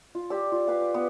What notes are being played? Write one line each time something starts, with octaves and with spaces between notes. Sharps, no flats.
F4
G4 D5 E6
F4
G4 B4 F5
D6
B3